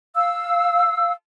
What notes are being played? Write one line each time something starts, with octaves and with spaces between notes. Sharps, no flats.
F5 E6